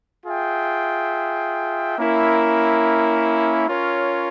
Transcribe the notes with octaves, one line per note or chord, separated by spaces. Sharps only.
F4 G#4 E5 G5
A#3 C#4 E4 A#4
C#4 F4 A#4 C#5